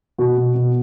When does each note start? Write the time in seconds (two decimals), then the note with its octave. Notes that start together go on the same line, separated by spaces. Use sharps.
0.18 B2 F#4
0.37 B2
0.56 B2